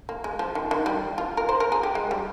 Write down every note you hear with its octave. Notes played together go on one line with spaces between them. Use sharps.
A#3
G#3
F3
D#3
D#3
G3
F4
A#4
C5
A#4
G#4
G4
G#3
G3